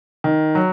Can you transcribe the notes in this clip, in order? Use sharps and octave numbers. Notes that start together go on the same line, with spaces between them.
D#3
F#3